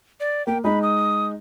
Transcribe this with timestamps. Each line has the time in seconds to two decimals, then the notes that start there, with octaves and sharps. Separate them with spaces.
0.20 D5
0.47 A#3 G5
0.64 G#3 D#4 B5
0.83 D#6